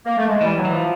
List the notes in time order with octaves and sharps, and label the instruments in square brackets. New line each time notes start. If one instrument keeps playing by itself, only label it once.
[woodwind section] A#3
A3
G#3
[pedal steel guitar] E3 [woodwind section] G3
[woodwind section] F#3
[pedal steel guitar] E3
[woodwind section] F3